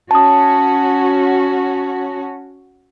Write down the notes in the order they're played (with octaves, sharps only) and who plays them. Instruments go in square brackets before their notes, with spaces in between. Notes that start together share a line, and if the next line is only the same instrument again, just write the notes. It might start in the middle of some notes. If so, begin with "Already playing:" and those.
[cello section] C#4 F#4 [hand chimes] A5 D#6